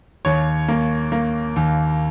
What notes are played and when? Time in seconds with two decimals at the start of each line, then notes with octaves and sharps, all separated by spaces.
0.25 D#2 C#5
0.68 A#3
1.12 A#3
1.56 D#2